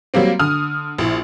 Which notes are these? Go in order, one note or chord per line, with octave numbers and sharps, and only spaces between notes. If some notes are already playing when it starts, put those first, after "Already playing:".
F#3 G3 A#3 C4
D3 D#6 F6
A#1 E4